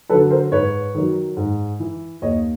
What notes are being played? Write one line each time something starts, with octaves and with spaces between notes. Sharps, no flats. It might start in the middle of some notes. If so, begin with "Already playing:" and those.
D3 F#3 A4 B4
A#4 C5
G#2 B4 C#5
D#3 F#3
G#2
E3
D#2 C#5 D#5